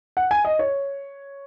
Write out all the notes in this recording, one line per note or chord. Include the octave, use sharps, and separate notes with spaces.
F#5
G#5
D#5
C#5